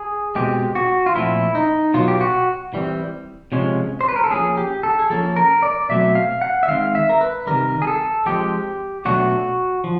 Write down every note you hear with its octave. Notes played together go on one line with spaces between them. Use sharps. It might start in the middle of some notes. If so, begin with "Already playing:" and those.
Already playing: G#4
B2 G#3 C4 G4
F#4
F4
A#2 F3 A3 C4 E4
D#4
B2 F#3 B3 F4
G4
F#4
E3 G3 C4
C3 F3 G#3 C#4
C5
B4
A#4
A4
F3 A#3 C#4 G#4
G4
A4
G#4
F3 A#3 C#4 A4
A#4
D5
B2 F#3 A3 C4 E5
F5
F#5
E5
D#3 G#3 C4 F5
E5
A#4
B4
C3 D#3 G3 A#4
G#4
A4
F3 G#3 C4 G4
B2 F#3 A3 D4 F#4
F3